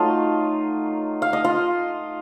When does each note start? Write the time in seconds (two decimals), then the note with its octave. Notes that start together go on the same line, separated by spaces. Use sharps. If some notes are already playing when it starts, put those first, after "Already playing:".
Already playing: F#3 A3 D#4 F4 D#5 F5
1.22 F5
1.33 D#5
1.45 F4 F5